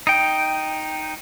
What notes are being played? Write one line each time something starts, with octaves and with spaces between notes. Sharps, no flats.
D#4 G5